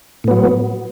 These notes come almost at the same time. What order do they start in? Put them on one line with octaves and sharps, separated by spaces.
A2 B3 F#3